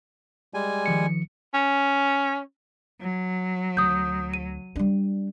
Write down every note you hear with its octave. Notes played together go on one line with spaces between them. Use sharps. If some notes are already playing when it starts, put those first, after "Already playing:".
G3 G#3 G#5
D#3 F3 C#7
C#4
F#3
D2 D#6 G6
D#7
G3 D4